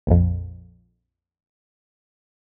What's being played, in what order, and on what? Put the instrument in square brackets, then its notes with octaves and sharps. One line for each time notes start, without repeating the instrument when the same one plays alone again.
[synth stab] A#1 F2